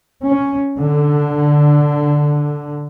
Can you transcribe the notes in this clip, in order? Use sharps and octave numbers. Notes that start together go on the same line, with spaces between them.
C#4
D3